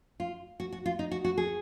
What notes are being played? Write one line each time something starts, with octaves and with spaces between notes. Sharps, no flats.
F4
F#4
F#4
F4
D#4
F#4
F#4
G#4